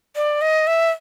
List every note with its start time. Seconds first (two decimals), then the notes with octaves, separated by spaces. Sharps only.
0.16 D5
0.41 D#5
0.67 E5